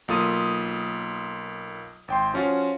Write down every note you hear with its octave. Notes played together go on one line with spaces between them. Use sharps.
B1 A#3 F4 A4 D#6 D#7
G#1 G5 C6
F3 C#4 F4 F#4